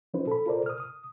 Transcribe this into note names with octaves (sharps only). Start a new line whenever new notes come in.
F3 C#4 D#4 F4 B4 C5
A4 B5
F4 A4 A#4 C5 D5
D#6 F6
D#6